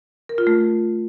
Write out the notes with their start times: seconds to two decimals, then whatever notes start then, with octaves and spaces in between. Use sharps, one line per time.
0.29 A#4
0.38 F4
0.47 A3